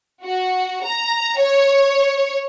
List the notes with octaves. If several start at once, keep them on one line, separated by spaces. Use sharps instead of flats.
F#4
A#5
C#5